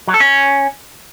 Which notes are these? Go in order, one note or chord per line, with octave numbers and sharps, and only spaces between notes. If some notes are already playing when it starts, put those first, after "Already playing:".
F#3
A4
C#4